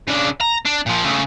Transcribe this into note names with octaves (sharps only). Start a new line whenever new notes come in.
C#3 D4
A#5
D4
A#2 F3
C#3 A3